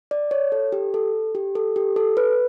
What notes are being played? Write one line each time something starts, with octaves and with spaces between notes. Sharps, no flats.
D5
C#5
A4
G4
A4
G4
A4
G4
A4
B4